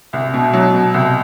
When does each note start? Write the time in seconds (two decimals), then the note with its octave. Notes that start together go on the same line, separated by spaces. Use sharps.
0.13 C2
0.34 B2
0.53 F#3
0.74 B2
0.94 C2